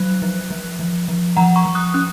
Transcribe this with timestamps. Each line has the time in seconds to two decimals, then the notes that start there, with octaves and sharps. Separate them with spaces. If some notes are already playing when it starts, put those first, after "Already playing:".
Already playing: F#3 F#6
0.22 F3
0.50 F3
0.79 F3
1.08 F3
1.36 F3 F#5 A#5
1.56 A#5 C#6
1.65 F3
1.75 D#6 F#6
1.94 C#4 D#6 F#6